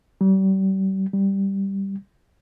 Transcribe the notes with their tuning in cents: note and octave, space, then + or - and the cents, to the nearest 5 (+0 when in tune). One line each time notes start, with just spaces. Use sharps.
G3 -35
G3 +0